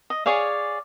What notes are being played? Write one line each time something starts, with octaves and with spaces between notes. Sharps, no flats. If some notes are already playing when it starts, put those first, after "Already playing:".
D#5
G#4 C#5 D5 F5